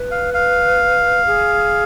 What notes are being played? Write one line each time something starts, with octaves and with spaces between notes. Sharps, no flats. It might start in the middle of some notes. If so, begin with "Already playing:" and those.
Already playing: B4
F5
F5
G#4